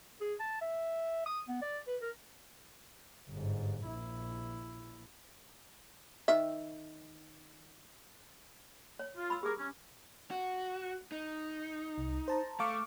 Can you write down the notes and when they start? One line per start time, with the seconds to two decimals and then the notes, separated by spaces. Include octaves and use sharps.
0.21 G#4
0.40 A5
0.61 E5
1.26 D#6
1.48 B3
1.62 D5
1.87 B4
2.02 A#4
3.29 G1 G#2
3.86 A#1 E4
6.28 D#3 E5
8.99 C#5
9.16 F4
9.30 B5 E6
9.43 G4 G#4 A#4 D6
9.57 C#4
10.31 F#4
11.12 D#4
11.98 C2
12.28 C5 A5 A#5
12.60 A3 F5 C#6 D6